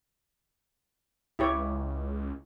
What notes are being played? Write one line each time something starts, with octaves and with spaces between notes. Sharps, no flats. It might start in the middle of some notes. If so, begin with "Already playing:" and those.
C#2 E4 G4 C#5